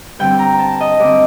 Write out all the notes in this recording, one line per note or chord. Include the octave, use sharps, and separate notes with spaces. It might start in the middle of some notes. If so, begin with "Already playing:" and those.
G2 D3 G3 C4 G5
A#5
A5
D#5
G2 D3 G3 C4 D5